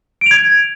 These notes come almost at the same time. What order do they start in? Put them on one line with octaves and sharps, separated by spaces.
D7 F7 G#6